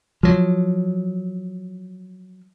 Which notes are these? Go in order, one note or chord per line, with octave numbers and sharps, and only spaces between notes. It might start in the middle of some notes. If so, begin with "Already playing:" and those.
F3 F#3